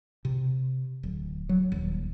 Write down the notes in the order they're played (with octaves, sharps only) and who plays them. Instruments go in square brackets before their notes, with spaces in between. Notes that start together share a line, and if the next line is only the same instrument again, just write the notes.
[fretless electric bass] C3
D1
F#3
D#1